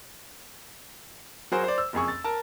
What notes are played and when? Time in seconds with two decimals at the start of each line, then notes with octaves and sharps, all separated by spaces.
1.52 F#3 F#4 G#4 A#4 C5
1.64 C5 D5
1.78 E6
1.93 F#1 F2 G#4 C#6
2.08 A6
2.24 A#4 A5